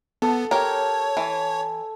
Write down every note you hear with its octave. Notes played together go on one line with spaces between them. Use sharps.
B3 A4
G4 A#4 C#5
E3